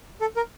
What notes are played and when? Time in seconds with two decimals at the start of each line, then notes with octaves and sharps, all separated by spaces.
0.21 A4
0.36 A#4